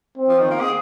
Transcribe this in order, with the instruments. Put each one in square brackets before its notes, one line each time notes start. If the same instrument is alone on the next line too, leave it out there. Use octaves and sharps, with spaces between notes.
[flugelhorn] C4
[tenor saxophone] F3
D#3
A#3
G#4